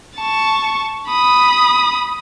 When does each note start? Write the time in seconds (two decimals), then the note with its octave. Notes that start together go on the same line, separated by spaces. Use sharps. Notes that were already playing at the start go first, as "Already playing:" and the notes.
0.17 A5 C#6
1.08 B5 D#6